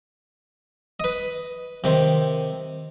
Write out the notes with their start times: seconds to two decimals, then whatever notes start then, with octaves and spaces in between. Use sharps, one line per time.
1.00 B4 D#5
1.84 C3 D#3 C5